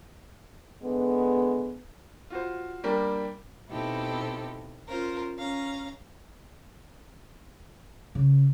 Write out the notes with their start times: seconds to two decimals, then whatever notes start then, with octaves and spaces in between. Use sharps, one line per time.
0.82 D3 G#3 B3
2.30 F4 F#4 C5
2.84 G3 A#3 D4 G4 A#4
3.70 B2 C4 D#4 E4 G4 A4
4.89 C#4 F4 A#4 C5
5.38 C#4 F5 A#5
8.15 C#3